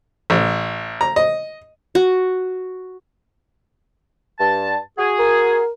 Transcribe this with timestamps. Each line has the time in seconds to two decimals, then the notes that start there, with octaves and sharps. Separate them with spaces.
0.30 A1
1.01 A#5
1.16 D#5
1.95 F#4
4.39 G2 A5
4.98 F#4 G#4
5.19 A#4